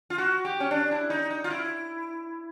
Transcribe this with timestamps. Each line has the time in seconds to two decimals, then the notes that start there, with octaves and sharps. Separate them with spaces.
0.10 F4
0.18 F#4
0.45 G4
0.60 C#4
0.71 D4
0.91 E4
1.10 D#4
1.31 D#4
1.44 F4
1.50 E4